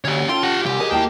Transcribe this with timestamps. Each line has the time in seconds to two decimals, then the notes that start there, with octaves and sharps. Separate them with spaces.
0.05 D2 C#4 G4 C#5
0.29 F4 A4 G5 C6
0.43 G4 F#5
0.66 C2 G4 G#5
0.80 F#3 G#4 A#4 B4 D#5
0.92 D#2 A#3 E4 G5 A5